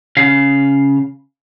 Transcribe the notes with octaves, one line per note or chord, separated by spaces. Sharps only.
C#3 F5